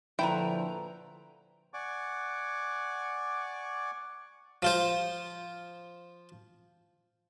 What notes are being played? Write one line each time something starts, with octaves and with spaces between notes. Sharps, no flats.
A#2 D3 F3 A3 E4 B4 G5 A#5
D5 F#5 G#5 C#6 D6
F3 F4 C5